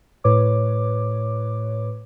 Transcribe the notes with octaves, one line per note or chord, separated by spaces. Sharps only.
A2 B4 C#5 D6